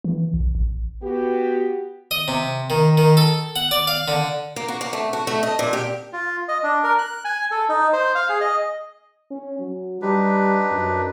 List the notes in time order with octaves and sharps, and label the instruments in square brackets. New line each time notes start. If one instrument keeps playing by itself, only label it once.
[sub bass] E3
B1
A1
[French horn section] B3 F#4 G4
[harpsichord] D#5
C3
D#3
D#3
A4
F#5
D5
F5
D3
[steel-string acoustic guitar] A#3
F#4
A#3
A3
F#4
A3
D#5
A#2
G4
[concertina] F4
D#5
D4
A#4
F#6
G#5
A4
D#4
C5
F5
G#4
D#5
[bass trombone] C#4
F#3
[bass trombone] G3 [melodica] D4 D#4 B4
[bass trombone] F#2